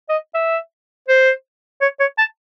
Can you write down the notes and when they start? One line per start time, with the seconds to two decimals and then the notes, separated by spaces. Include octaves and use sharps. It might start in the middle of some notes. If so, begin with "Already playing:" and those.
0.09 D#5
0.35 E5
1.08 C5
1.81 C#5
2.00 C#5
2.18 A5